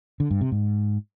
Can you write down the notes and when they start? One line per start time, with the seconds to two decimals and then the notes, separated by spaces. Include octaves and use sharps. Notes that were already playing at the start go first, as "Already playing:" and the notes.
0.20 D3
0.31 G2
0.41 C3
0.52 G#2